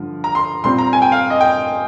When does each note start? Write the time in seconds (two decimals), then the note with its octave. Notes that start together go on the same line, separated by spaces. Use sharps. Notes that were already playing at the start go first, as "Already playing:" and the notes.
Already playing: G2 D3 F3
0.24 A#5
0.35 C6
0.64 A#2 G3 C4 C6
0.78 A#5
0.93 G#5
1.02 G5
1.12 F5
1.30 D#5
1.41 G5